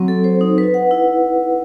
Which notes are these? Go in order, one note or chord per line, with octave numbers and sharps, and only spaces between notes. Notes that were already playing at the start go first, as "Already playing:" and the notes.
Already playing: F#3 C4
A4
C5
D#4
B4
F#5
E4